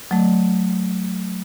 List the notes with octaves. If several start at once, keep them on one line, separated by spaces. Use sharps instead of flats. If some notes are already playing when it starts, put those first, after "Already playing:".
F#3 A3